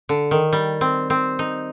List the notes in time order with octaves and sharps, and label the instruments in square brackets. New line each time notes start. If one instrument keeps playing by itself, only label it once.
[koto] D3
D#3
G3
C4
C4
D#4